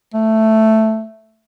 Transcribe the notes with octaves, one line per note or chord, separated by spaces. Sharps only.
A3